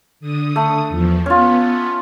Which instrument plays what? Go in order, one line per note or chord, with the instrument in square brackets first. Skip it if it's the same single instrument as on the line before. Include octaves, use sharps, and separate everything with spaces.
[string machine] D3 D#6
[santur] A3
[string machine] E2 F3
[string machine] B3 [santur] C#4 F4